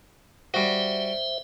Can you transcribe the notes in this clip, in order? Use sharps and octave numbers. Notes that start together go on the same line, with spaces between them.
G3 F#4 C5 E5